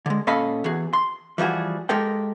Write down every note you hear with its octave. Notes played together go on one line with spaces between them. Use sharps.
D3 G#3
A#2 C#4 A4 D#5 F5 B5
E2 F#4 G#4
C6
E3 F3 G3 F#4 G#4
G#3 G4 A4 A#4 G5